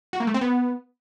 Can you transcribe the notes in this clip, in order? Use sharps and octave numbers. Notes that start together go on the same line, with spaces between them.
F#4
A#3
A3
C4
B3